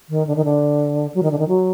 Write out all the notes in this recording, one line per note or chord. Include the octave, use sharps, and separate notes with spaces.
D#3
D3
D#3
D3
F#3
D#3
D3
D#3
F#3